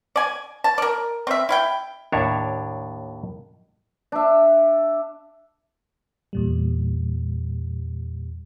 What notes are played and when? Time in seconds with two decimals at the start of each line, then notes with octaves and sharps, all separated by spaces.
0.16 D5 G#5
0.64 A5
0.78 A#4 D5
1.27 C4 E5
1.49 E4 F5 G5
2.12 D#2 A2 D4 C#5 E5 A#5
4.12 D4 E5
6.33 E2 A#2 G3